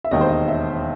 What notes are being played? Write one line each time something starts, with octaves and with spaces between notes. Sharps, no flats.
E5
E1 D#2 D#3 D#5
C5
D#5
E5